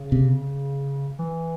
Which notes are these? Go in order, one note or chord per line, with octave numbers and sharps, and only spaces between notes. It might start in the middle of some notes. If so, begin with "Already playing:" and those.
Already playing: C#3
C3
E3